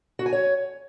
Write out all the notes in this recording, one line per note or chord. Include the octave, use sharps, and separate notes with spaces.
F#4
G#5
C#5